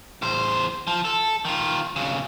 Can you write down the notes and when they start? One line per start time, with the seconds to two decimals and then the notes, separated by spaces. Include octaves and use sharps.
0.22 E2 C5
0.87 F3
1.05 A4
1.45 D#3 F4
1.96 B1 C#3